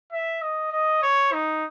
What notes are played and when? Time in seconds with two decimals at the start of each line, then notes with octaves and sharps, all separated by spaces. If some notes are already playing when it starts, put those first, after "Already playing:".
0.12 E5
0.42 D#5
0.72 D#5
1.03 C#5
1.33 D#4